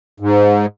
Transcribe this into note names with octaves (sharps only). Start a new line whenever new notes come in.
G#2